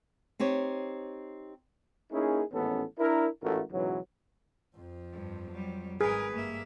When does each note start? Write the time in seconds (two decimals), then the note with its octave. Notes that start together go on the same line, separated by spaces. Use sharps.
0.39 C4 D#4 G4 C#5
2.12 A#3 C#4 D#4 E4 G#4
2.53 A1 D#2 G#2 B3 C#4 A4
2.98 D4 E4 A#4
3.43 A1 G#2 A3 F4 F#4 A#4
3.71 C#2 G#2 B2 E3 F#3
4.76 F2 F3
5.13 G2
5.52 F#3 G3
6.01 G#1 G#2 G#4 A#4 B4
6.33 G2 A#3 E5